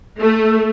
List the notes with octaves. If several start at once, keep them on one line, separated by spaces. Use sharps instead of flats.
A3